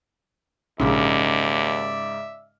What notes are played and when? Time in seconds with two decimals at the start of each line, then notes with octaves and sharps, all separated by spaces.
0.80 A#1 D#2 G#2 C#3 D5 E5